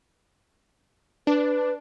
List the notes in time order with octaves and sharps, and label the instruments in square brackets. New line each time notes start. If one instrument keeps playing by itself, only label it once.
[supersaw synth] D4 [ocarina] B4